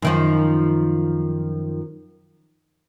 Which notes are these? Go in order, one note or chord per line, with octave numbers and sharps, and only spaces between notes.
F#2 D#3 F3